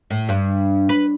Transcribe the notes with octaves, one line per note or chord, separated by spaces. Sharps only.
A2
G2
B4